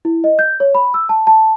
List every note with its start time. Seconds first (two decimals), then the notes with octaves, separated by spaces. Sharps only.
0.05 E4
0.24 D#5
0.39 G6
0.60 C#5
0.75 B5
0.94 E6
1.09 A5
1.27 A5